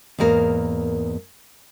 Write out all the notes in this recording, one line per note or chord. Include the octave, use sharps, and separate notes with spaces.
E2 G#2 A#3 A#4